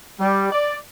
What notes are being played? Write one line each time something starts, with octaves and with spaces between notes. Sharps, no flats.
G3
D5